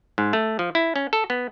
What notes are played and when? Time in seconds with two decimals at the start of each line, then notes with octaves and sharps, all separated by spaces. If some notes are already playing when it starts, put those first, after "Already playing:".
0.18 G#2
0.33 A3
0.59 F3
0.75 E4
0.96 C#4
1.13 A4
1.30 B3